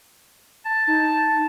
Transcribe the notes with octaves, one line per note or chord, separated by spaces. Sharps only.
A5
D#4